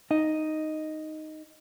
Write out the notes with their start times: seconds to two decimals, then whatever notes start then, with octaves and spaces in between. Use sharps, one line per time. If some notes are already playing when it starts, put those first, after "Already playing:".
0.11 D#4 D#5